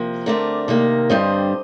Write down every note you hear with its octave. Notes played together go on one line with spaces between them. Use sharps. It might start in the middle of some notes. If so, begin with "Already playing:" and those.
Already playing: C3 F3 A#3
D3 A3 C4 A#4 D5
C3 D#3 A#3
G2 D3 G3 C4 C5 D#5